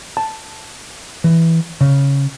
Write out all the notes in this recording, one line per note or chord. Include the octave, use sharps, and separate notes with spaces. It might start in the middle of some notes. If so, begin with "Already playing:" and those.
A5
E3
C#3